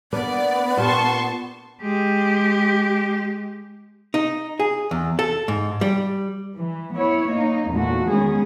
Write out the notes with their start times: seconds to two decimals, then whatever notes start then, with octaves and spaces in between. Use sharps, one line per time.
0.13 A#3 B3 D4 B4 D5
0.77 A#2 F4 G4 A5 C6 C#6
1.82 G#3 G4
4.14 D#4
4.60 G#4
4.91 E2
5.19 A4
5.48 G#2
5.81 G3
6.58 E3
6.95 B3 E4 C#5
7.29 A#3 D#4
7.71 E2 A#2 A3 F#4
8.11 D#3 G#3 B3 C#4 G#4